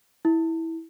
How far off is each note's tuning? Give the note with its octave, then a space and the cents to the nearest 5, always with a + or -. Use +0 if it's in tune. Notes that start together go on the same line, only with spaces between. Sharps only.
E4 -15